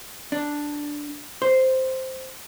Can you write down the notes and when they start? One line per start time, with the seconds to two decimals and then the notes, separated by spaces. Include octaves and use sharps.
0.32 D4
1.42 C5